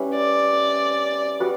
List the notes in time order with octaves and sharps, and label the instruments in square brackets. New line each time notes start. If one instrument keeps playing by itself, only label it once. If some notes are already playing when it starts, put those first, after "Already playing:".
Already playing: [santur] G3 C#4 E4 B4
[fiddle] D5
[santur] G3 B3 F#4 B4